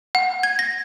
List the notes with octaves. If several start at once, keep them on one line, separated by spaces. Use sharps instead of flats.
F#5
G#6
A#6